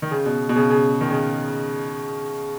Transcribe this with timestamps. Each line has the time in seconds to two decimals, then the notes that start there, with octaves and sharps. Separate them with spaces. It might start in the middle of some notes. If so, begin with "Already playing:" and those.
0.02 D#3
0.11 C#3
0.25 B2
0.49 B2
0.56 C#3
0.70 C#3
1.01 D#3
1.10 C#3